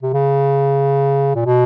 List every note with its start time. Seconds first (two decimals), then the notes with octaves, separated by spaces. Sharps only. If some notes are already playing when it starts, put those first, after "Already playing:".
0.03 C3
0.13 C#3
1.35 A#2
1.46 B2